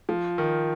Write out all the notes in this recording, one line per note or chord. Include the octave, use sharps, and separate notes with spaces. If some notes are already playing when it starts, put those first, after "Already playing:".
F3
D#3